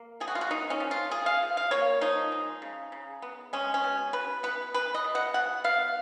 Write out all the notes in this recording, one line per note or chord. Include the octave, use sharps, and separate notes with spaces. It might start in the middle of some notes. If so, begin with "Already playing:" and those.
Already playing: A#3
F3 G#4
F#4
F4
F#4
A#3 D#4
C#4
F3
F4
A#3 G#4
F5
F3
F5
A#3 C#5
F3 D#4
G#3
C#3
C#3
B3
G#3 C#4
C#4
B2
B2 B4
B3 B4
G#3 B4
D#5
B2
F#5
B2 F#5
B3 F5